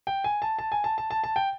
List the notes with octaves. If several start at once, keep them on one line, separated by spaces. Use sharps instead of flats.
G5
G#5
A5
A5
G#5
A5
A5
A5
A5
G5